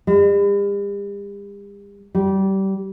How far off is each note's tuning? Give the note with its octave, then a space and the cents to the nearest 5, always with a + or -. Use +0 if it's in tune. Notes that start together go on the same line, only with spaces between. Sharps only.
G3 +45
G3 -25